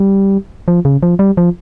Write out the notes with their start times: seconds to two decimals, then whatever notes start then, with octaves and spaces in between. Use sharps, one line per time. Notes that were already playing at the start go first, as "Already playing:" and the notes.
Already playing: G3
0.68 F3
0.85 C#3
1.03 F3
1.19 G3
1.37 F3